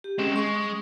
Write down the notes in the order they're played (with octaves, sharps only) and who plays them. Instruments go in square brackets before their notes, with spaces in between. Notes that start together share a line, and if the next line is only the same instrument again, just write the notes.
[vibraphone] G4
[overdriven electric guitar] G#3 C4 [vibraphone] C#4
[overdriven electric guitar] G#3 [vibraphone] C#6